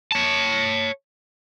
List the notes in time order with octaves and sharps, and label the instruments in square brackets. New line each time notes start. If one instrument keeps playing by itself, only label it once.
[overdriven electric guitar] C#5 A5